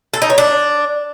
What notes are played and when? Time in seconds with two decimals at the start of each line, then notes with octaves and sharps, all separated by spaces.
0.14 A4
0.22 D#4
0.30 C#5
0.38 D4